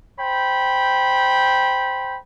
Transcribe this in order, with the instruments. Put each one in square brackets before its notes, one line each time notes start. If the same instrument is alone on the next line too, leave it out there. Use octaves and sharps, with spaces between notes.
[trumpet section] C5 G5 B5